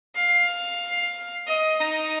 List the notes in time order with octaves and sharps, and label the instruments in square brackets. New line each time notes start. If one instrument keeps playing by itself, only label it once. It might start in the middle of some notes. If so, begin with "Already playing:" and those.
[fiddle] F5
D#5
D#4